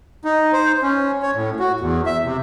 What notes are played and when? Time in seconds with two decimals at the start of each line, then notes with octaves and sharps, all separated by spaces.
0.25 D#4
0.53 C5
0.83 C#4
1.22 C#5
1.35 A2
1.59 F#4
1.80 E2
2.06 E5
2.25 C3